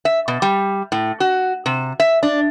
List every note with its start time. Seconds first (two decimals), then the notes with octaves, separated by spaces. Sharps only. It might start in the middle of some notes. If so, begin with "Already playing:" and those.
0.05 E5
0.28 B2
0.42 G3
0.92 A2
1.20 F#4
1.66 C3
2.00 E5
2.23 D4